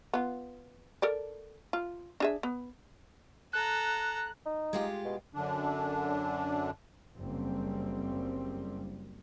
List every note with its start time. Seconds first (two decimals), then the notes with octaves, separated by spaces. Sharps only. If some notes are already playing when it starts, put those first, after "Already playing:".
0.14 B3 F4
1.02 A4 A#4 D5
1.73 F4
2.20 D4 G#4 E5
2.43 B3
3.53 A4 A#5 F#6
4.46 D#4
4.73 G#3 F4 G4
5.05 B2
5.35 F#2 D3 D4
7.16 F#1 G3 C4